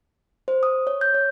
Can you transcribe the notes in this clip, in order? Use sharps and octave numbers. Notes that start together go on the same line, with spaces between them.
C5
D#6
C#5
G6
C#5